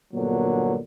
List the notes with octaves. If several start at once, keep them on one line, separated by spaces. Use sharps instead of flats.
G1 A#2 D3 F#3 B3 A#4